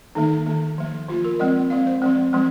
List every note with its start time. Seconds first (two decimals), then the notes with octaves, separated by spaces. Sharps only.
0.15 D#3 A#3 D#4
0.47 D#3 A#3
0.78 F3 A#3
1.09 F3 A#3 F4
1.25 A#4
1.39 F3 G#3 C4 D#5
1.70 F3 G#3 C4 F5
1.87 C5
2.02 F3 G#3 C4
2.33 F3 G#3 C4